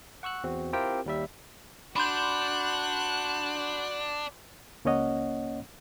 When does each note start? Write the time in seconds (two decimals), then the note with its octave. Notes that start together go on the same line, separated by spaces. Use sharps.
0.23 F#5 C#6 E6 F#6
0.44 E2 C4 F#4
0.73 C4 E4 F4 G4 A#4 G5
1.06 D#2 G3 E5
1.96 D4 F#4 B5 C6 F#6 G6
4.85 C#2 A#3 C#4 C#5 D#5 F#5